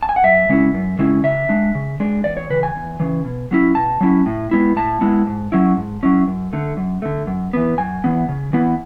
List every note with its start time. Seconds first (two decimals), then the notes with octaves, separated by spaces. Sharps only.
0.03 A5
0.09 G#5
0.16 F#5
0.24 F#2 E5
0.49 C#3 G#3 C#4 E4
0.74 F#2
0.99 C#3 G#3 C#4 E4
1.24 C#3 E5
1.49 G#3 D4
1.75 C#3
2.00 G#3 D4
2.24 E2 D5
2.37 C#5
2.50 C#3 E3 B4
2.63 G#5
2.76 E2
3.00 C#3 E3
3.25 B2
3.51 F#3 C#4 E4
3.75 B2 A5
4.01 F#3 C#4 E4
4.26 A2
4.51 G#3 B3 E4
4.76 A2 A5
5.01 G#3 B3 E4
5.27 G#2
5.52 F#3 C#4 E4
5.77 G#2
6.03 F#3 C#4 E4
6.28 F#2
6.53 D3 A3
6.77 F#2
7.02 D3 A3
7.27 F#2
7.53 E3 B3
7.78 F#2 G#5
8.04 E3 B3
8.29 C#3
8.53 E3 B3 E4